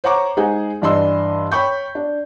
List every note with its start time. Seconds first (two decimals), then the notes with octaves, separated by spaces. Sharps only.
0.04 C5 C#5 F#5 A#5 C#6 D6
0.37 G#3 D#4 G#4 C5 F#5 G#5
0.82 G2 E3 D4 D#5 C6 E6
1.51 C#5 G5 B5 C#6 G6
1.95 D4